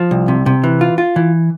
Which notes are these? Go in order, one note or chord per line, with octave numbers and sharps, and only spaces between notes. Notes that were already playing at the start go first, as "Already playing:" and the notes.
Already playing: F3
C2
C3
C3
E3
F4
F4
E3